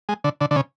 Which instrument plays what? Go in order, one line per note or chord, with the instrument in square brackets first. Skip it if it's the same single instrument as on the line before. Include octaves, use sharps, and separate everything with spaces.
[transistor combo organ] G#3
D3
D3
D3
C#3